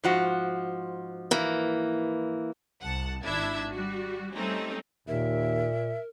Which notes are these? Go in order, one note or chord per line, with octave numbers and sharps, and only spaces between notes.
G#2 F3 F#4
E3 A#3
C2 F#5 A5
G#1 D4 E4 E5 G#6
G3 F#4
G3 A3 C4 C#4 D#4
D#2 A#2 A#4 E5